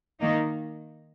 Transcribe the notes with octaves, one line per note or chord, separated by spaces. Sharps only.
D#3 A#3 D#4